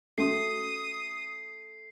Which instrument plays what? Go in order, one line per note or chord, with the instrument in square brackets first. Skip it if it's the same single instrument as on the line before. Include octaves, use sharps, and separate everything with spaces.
[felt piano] A3 [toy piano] C#4 F#4 A4 [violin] D#6 [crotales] C7